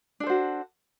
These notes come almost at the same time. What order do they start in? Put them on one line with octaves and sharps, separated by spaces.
D4 A4 C5 F#4